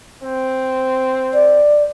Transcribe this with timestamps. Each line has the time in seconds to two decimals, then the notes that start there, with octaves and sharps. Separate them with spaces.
0.23 C4
1.34 D5